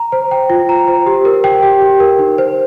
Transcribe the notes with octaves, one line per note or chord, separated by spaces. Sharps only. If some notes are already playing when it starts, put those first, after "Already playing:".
Already playing: A#5
C5
G5
F4
A#5
C5
G4
A#4
G5
G4
G4
A#4
D#4
C5